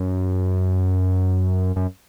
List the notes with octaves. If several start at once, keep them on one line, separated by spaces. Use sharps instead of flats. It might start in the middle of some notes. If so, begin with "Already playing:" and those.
Already playing: F#2
F#2